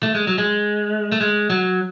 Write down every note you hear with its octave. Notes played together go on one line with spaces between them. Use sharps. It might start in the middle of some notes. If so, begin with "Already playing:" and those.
A3
G#3
F#3
G#3
A3
G#3
F#3